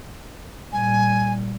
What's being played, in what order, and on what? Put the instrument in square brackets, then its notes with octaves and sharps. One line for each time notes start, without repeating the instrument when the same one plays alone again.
[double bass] A#2 G3 [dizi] G#5